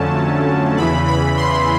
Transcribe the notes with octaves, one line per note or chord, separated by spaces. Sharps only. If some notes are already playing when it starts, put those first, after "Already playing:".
Already playing: F2 D3 F#3 A3 C#4 A5
E2 C#3 E3 B5
B5
C6